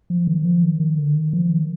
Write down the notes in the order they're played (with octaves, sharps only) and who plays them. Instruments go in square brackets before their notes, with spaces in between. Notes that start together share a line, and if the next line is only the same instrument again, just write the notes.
[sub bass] F3
D#3
F3
D#3
D#3
D3
D#3
F3
D#3